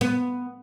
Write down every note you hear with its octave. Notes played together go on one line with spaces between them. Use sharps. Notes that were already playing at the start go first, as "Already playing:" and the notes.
B3